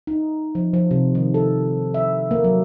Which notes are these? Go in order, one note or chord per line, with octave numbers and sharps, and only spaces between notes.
D#4
F3
F3
C3
D#3
A4
E5
A#3
F#3